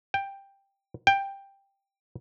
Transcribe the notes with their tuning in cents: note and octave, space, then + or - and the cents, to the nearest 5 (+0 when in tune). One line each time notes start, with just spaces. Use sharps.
G5 +10
G5 +10